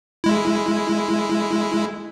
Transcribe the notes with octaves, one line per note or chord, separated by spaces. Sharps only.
G#3 E4